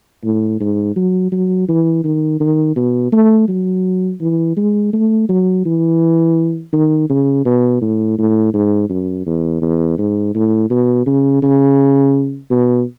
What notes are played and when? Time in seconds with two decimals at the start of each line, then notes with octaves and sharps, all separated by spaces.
0.24 A2
0.60 G#2
0.96 F#3
1.32 F#3
1.68 E3
2.04 D#3
2.40 D#3
2.76 B2
3.12 A3
3.48 F#3
4.21 E3
4.57 G#3
4.93 A3
5.29 F#3
5.65 E3
6.73 D#3
7.09 C#3
7.45 B2
7.81 A2
8.18 A2
8.54 G#2
8.89 F#2
9.26 E2
9.62 E2
9.98 G#2
10.34 A2
10.70 B2
11.06 C#3
11.42 C#3
12.51 B2